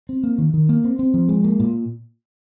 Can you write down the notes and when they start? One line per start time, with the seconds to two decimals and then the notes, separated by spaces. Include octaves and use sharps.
0.09 C4
0.24 A#3
0.38 D#3
0.54 D#3
0.69 A#3
0.84 C4
0.99 C4
1.14 F3
1.29 G#3
1.44 A#3
1.60 A#2